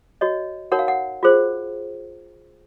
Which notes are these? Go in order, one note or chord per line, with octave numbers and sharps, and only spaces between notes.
F#4 C#5 D#5
D#4 F#4 A#4 C#5 F#5
F5
F#5
F4 G#4 C5